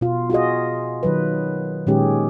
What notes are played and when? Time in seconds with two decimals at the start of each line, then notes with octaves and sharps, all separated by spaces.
0.01 B2 F4
0.30 F4 F#4 G#4 D#5
1.03 D#3 F#3 B4
1.87 A#2 D#3 G#3 C#4 G4 G#4